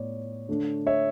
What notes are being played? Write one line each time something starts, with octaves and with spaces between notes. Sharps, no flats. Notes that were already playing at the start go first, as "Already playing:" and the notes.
Already playing: A2 B3 C#5 D5
D3 A3 D4
C#5 E5